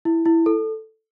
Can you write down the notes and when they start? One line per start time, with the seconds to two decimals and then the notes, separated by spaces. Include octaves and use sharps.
0.05 E4
0.26 E4
0.46 A4